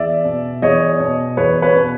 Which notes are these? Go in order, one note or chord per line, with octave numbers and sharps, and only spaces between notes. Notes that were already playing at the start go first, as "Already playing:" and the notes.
Already playing: E2 D5 E5
B2
E2 C#5 D#5
B2
E2 B4 C#5
B4 C#5
B2